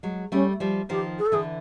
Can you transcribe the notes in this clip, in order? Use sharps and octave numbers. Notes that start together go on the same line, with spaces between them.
F#3 G#3
G3 A3 C#4
F3 G3
D#3 F3 G4
G#4
A4
D3 E3 G#4